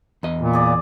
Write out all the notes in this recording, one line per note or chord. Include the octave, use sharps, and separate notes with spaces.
E2 D#5
A#2
G#4 D5